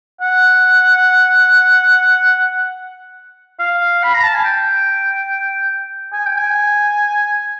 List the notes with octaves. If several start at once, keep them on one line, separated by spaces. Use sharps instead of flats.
F#5
F5
B5
A#5
A5
G#5
G5
G#5
G5
G#5